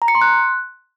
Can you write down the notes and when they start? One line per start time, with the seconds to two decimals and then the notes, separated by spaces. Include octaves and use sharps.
0.02 A#5
0.08 C#7
0.15 C6
0.21 F#6